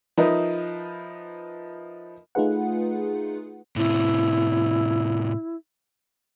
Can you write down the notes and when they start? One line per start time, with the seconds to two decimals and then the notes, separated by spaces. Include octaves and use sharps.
0.17 F3 D#4 A#4 B4 D#5 E5
2.35 A3 D#4 F4 G#4 B4 F#5
3.76 A2 C3 E4